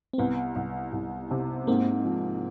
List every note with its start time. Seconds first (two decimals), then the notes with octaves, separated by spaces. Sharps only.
0.13 C4
0.18 C2 B3
0.56 C2
0.93 C2
1.31 C3
1.67 G#2 A#3 C4
2.05 F3